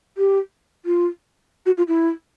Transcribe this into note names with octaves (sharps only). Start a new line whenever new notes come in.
G4
F4
F#4
F4
E4